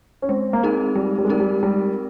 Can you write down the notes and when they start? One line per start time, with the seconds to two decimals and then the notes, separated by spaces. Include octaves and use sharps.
0.22 C#4
0.29 G#3 C4
0.53 A#3
0.63 G#3 C4 D#4 A#4
0.96 G3 G#3
1.18 G3
1.25 G#3
1.29 G3 C4 D#4 A#4
1.40 G3
1.63 G3 G#3